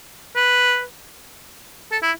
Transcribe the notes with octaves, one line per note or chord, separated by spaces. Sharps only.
B4
A4
E4